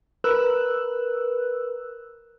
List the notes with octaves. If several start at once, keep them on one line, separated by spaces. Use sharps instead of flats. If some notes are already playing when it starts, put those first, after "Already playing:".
A#4 B4 E6 F#6